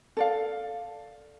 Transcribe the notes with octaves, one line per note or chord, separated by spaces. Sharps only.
A4 D5 F5